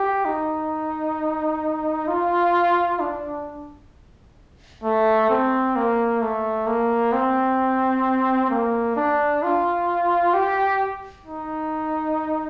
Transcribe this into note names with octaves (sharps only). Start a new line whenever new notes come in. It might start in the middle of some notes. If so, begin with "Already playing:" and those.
Already playing: G4
D#4
F4
D4
A3
C4
A#3
A3
A#3
C4
A#3
D4
F4
G4
D#4